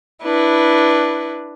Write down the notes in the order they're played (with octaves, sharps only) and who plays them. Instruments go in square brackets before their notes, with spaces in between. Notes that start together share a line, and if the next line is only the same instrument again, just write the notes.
[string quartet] D4 E4 B4